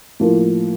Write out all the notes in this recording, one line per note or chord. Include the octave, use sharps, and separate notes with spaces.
A2 F3 A#3